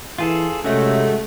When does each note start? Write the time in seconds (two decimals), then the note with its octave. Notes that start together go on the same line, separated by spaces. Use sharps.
0.19 E3 F4 G#4 A4
0.64 C3 G#3 A3 C#4 F#4